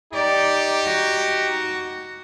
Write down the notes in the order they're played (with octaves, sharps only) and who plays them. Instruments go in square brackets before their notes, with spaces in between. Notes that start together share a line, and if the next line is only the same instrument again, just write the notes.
[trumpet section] D#4 G4 [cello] D5
[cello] F#4